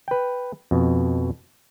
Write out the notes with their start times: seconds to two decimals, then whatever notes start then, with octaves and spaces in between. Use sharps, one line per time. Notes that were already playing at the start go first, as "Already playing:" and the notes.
0.08 B4 G5
0.71 F2 B2